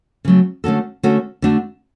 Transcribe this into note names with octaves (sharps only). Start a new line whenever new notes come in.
C#3 F#3 A3
D3 A3 C#4 F#4 A4
D3 A3 C#4 F#4 A4
D3 A3 D4 F#4